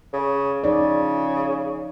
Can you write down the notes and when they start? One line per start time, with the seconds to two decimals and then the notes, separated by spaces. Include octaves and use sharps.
0.13 C#3
0.64 C#3 F3 D#4 D5